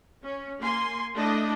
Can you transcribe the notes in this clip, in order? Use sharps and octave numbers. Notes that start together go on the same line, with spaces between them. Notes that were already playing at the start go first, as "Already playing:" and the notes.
C#4
A#3 G#5 C6
A3 D4 E4 D#5